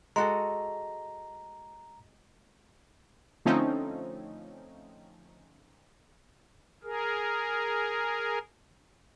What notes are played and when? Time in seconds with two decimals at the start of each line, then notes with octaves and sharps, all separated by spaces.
0.16 G#3 F#4 A4 A#5
3.46 D3 F3 A3 C4 C#4 D#4
6.83 G#4 A#4